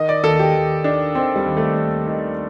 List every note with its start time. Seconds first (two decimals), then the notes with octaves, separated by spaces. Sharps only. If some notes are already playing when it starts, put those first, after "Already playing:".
Already playing: D#3 D#5
0.09 D5
0.23 D#2 A4
0.39 G4
0.54 D#2
0.84 D#3 D4
1.15 D#3 C4
1.36 G3
1.46 D#2
1.57 A3
1.77 D#2
2.07 D#3